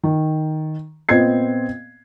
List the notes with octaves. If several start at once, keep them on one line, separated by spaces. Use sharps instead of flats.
D#3
A#2 B3 C4 D#5 G#6 C7